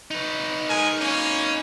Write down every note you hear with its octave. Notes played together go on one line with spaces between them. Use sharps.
D#4 B4
G#3 A#4 G#5
A#3 C#4